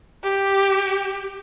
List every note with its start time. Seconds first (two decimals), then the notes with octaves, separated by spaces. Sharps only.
0.23 G4